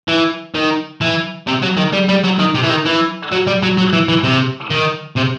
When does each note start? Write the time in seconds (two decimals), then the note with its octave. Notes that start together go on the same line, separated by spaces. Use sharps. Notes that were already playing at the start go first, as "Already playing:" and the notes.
0.08 E3
0.55 D#3
1.01 E3
1.47 C3
1.63 F#3
1.77 D#3
1.93 G3
2.09 G3
2.24 F#3
2.39 D#3
2.55 C3
2.63 E3
2.70 D#3
2.86 E3
3.32 F#3
3.47 G3
3.63 F#3
3.78 F#3
3.93 E3
4.08 E3
4.24 C3
4.70 D#3
5.16 C3